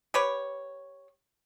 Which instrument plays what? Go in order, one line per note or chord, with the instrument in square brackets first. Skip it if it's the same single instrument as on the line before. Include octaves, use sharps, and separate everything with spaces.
[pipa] G4 B4 C#5